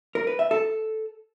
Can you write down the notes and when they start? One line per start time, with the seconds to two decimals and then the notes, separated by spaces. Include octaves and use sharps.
0.15 A#4
0.27 B4
0.39 E5
0.51 A4